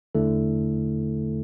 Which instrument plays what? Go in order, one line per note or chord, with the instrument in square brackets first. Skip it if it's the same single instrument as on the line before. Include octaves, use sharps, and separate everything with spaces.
[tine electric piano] E2 D3 A3 E4 A4